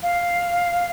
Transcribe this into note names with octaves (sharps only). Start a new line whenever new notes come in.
F5